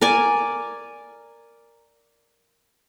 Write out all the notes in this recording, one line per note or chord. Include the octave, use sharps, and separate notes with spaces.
A#4 D5 G#5